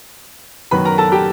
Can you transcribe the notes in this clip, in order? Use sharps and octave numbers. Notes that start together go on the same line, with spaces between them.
F#2 D#3 F#3 B3 B4 B5
A#4 A#5
A4 A5
G4 G5